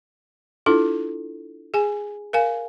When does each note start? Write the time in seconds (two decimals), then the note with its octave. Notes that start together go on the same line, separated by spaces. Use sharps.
0.66 D4 E4 F4 A4
1.74 G#4 G#5
2.33 A#4 F5 G#5